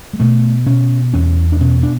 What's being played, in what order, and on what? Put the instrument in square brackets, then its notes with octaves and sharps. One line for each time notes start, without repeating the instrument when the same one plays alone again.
[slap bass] G#3
B2 A3
B2 C#4
E2 C#4
D4
B2 C#4
D4